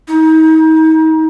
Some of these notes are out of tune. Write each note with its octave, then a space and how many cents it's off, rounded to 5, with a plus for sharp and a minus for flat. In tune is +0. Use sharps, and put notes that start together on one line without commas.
D#4 +35